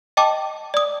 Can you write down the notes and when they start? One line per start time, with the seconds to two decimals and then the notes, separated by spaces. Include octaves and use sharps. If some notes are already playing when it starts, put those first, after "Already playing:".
0.17 D#5 G5 A5 D6
0.74 D5 D#6